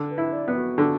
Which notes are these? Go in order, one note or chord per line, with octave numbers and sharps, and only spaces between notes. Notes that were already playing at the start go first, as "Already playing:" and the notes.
Already playing: D3
B4
E4
D5
B3
F#4
D3